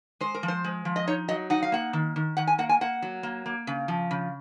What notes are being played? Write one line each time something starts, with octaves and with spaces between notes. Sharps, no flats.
G#3 C5
A#4
F3
C5
G#3
F3
D#5
D#4 C#5
F#3 D#5
D#4 F#5
F5
A#3 F#5
D#3
D#3
D#3 F#5
G#5
A#3 F#5
G#5
A#3 F#5
F#3
A#3
A#3
C#3
F3
C#3